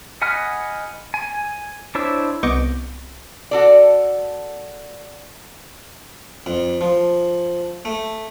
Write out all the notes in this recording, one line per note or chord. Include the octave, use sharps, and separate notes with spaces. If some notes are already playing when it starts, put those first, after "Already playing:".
D#5 F#5 G#5 B5 F6
G#5
D4 E4 C5 C#5 E6
C2 B3 D#5 C#6 D6 G6
F#4 A4 D5
F2
F3
A3